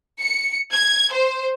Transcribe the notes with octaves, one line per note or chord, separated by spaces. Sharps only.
C#7
G#6
C5